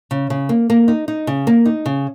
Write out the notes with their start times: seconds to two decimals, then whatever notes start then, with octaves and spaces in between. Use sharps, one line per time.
0.11 C#3
0.30 C#3
0.49 A#3
0.70 A#3
0.88 D#4
1.08 D#4
1.27 C#3
1.47 A#3
1.65 D#4
1.86 C#3